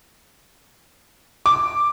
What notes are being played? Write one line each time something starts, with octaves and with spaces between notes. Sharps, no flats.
D6